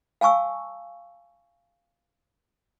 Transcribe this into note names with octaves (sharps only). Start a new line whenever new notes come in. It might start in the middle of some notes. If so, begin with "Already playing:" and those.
F5 G#5 A5 C#6 E6